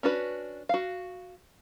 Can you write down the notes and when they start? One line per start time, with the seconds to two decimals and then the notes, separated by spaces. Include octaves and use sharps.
0.03 C#4 D4 F#4 B4
0.69 F#4 F5